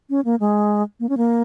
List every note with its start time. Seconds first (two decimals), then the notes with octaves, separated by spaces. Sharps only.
0.10 C#4
0.25 A#3
0.40 G#3
1.00 A#3
1.09 C#4
1.17 A#3